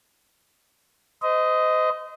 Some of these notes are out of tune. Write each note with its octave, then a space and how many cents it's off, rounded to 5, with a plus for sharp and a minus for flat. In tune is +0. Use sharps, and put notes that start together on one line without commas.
C5 -35 D#5 +10